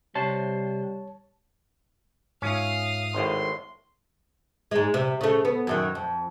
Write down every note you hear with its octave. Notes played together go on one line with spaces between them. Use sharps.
C3 G3 C5 C#5 A5
G#2 C#4 F4 E5 F5 D#6
G#1 A2 C6
G#2 G#3
C3
C#3 A3
B3
F#2 D#3 F#3
F2